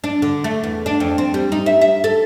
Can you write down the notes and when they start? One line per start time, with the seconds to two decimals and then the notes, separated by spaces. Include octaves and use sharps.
0.04 D4
0.22 D3
0.44 A3
0.64 E2
0.86 D4
1.00 F2
1.18 C4
1.34 G3
1.52 D#4
1.66 E5
1.81 E5
2.04 A4